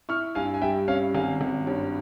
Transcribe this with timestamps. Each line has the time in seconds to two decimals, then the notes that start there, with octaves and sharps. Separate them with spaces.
0.09 E4 C#6 F6
0.35 G2 F5 G#5
0.54 G#5
0.61 G3 E5 G5
0.88 C#4 C#5 F5
1.14 G#1 F5 G#5
1.41 G#1
1.67 G2 C#5